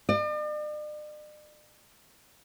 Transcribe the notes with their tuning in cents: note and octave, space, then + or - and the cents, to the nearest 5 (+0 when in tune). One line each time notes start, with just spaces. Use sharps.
D5 +45